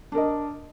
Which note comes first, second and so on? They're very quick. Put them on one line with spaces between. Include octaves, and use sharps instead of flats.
D4 A#4 D#5